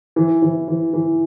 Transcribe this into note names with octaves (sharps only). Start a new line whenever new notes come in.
E3
E3
E3
E3